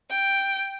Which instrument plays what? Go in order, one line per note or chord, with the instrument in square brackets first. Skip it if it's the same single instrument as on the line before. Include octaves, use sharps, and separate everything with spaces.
[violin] G5